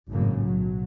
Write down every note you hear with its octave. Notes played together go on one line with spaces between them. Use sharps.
G#1 F#2 A2 C#3 A#3
B1 F#3